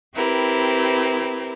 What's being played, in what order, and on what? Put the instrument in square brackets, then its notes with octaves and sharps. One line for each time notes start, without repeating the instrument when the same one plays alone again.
[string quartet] C4 E4 G4 A#4 B4